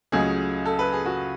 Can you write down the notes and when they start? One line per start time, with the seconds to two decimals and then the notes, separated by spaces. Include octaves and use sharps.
0.12 C#2 C#3 F#3 A3 G#4
0.66 A4
0.79 B4
0.93 G#4
1.06 F#4